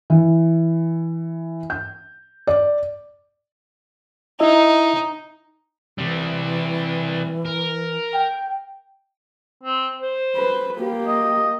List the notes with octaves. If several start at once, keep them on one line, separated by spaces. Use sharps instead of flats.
E3
G6
D5
D#4 E4 D#5 E5
C3 E3 G3
A#4
G5
C4
C5
B4
A#3 G4
D#5